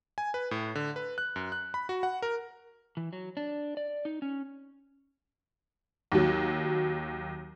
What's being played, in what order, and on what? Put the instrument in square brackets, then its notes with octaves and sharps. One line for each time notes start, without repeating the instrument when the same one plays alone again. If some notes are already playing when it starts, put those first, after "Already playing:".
[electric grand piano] G#5
B4
A2
D3
B4
F#6
F#2
F#6
B5
F#4
F#5
A#4
[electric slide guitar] E3
F#3
D4
D5
D#4
C#4
[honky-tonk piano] D#2 F#3